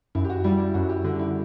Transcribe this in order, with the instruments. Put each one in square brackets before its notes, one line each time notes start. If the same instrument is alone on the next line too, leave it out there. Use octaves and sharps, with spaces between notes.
[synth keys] F#2 [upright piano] E4
[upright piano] G4
F#4
[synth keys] G3 [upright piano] E4
[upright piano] E4
[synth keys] F#2 [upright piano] F#4
[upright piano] G4
[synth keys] D3 [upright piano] F#4
[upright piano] E4